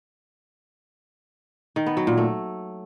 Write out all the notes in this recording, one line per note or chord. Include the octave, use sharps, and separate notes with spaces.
D#3
B3
F#3
A#2
A3